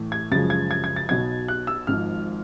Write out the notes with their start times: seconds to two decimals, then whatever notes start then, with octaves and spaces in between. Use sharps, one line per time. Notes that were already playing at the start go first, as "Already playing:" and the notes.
Already playing: A2 E3 A3
0.12 G#6
0.32 F#2 C#3 F3 G#3 A6
0.50 G#6
0.71 G#6
0.84 G#6
0.96 A6
1.09 B1 B2 F#3 B3 G#6
1.48 F#6
1.67 E6
1.87 G#1 G#2 F3 F6